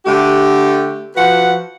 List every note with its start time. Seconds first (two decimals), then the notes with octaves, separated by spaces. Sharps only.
0.05 D3 A3 G4
1.16 F3 F#4 B4 F#5